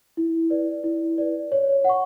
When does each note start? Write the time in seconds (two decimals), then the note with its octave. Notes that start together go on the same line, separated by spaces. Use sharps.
0.17 E4
0.50 B4 D5
0.84 E4
1.18 B4 D5
1.52 C#5
1.84 F#5 C#6